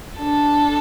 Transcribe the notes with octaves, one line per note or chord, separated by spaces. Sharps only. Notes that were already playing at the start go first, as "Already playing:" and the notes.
D4 A4